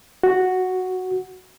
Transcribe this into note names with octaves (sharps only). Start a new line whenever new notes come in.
F#4